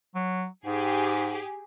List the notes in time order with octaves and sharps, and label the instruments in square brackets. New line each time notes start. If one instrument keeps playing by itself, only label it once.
[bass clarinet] F#3
[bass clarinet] G#2 [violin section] G4 G#4